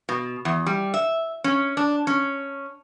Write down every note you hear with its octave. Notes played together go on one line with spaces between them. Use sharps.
B2
E2
G3
E5
C#4
D4
C#4